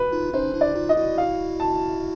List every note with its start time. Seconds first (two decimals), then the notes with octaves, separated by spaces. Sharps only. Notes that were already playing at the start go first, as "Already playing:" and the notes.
Already playing: B4
0.12 D#4 F4
0.33 C#4 D#4 C5
0.54 D4 E4
0.61 D5
0.75 D#4 F4
0.89 D#5
0.97 E4 F#4
1.18 F5
1.60 A5